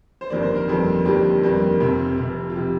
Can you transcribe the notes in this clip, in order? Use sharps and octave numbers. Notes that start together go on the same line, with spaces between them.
C5
G1 F2 D#3 G3 A#3 D5
C5
A#4
G1 F2 D#3 G3 A#3 A4
G1 F2 D#3 G3 A#3 G4
G1 F2 D#3 G3 A#3
F1 F2 C3
F1 F2 C3
F4
C3 G4